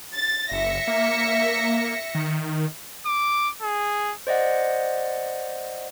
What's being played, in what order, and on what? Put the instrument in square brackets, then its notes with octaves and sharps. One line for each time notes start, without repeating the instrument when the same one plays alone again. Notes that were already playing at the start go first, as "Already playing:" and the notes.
[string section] A6
[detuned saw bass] F#1 [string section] E5 A#6 C#7
[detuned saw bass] A#3
D#3
[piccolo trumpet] D6
G#4
[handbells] C5 D5 D#5 F#5